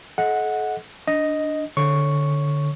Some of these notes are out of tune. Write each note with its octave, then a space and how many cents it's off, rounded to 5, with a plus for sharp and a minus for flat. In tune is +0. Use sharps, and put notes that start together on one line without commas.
A4 -40 D#5 +20 F#5 -10
D4 +0 D#5 +0
D3 +0 C#5 -5 C#6 +0